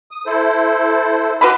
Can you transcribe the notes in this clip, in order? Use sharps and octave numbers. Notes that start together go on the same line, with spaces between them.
D#6
E4 A4 C5
F#4 B4 B5 C6 D6 F6